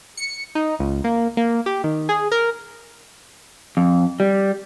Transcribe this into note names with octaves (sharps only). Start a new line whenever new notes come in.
C#7
D#4
C#2
A#3
A#3
G4
D#3
G#4
A#4
F2
G3